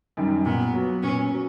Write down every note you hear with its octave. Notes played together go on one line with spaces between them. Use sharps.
F#2 D#3 G3
A#2 B3
F#3 B3
A#2 C#4
F#3